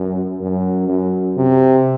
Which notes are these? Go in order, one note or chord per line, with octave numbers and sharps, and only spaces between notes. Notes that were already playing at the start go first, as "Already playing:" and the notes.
Already playing: F#2
F#2
F#2
C3